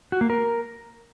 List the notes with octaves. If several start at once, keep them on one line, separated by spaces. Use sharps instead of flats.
F#4
A#3
A#4